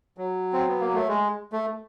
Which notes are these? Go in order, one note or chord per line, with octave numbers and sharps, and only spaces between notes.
F#3
C4
B3
A#3
A3
G#3
A3